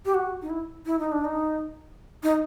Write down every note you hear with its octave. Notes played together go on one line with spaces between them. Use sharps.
G4
F#4
D#4
E4
E4
D#4
D4
D#4
D#4